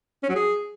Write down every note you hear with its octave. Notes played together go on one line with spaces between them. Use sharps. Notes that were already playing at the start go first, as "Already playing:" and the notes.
C#4
F#3
G#4